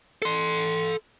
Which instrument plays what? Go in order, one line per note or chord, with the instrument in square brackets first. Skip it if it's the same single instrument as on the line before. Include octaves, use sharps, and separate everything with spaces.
[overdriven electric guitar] A4 C6